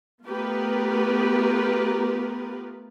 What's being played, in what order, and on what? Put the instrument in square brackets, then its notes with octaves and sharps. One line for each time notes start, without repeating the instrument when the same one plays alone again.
[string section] A3 B3 F4 G4 A#4 B4